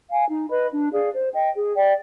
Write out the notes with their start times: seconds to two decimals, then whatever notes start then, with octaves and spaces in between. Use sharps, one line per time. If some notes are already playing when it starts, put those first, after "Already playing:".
0.08 F5 G#5
0.29 D#4
0.51 B4 D#5 B5
0.72 D4
0.92 G#4 D5 F5
1.13 C5
1.34 D#5 G5
1.55 G#4
1.76 D5 G5